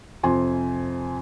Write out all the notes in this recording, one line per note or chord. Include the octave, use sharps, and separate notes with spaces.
F2 C3 G#5 C6